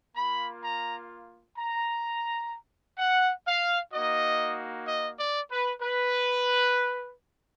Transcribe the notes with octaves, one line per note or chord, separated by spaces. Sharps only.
A#3 F4 B5
A#5
A#5
F#5
F5
A#3 D#4 F#4 D#5
D#5
D5
B4
B4